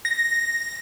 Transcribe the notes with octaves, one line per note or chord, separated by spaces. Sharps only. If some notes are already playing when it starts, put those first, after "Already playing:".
A#6